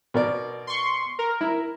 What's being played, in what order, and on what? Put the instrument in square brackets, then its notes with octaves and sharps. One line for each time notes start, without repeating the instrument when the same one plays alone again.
[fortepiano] B2 A#4 D5
[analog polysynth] C6 C#6
A#4
[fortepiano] E4